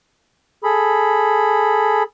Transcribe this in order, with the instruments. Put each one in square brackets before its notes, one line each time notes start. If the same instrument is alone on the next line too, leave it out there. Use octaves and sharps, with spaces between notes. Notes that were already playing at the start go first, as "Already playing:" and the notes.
[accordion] G#4 A4 B5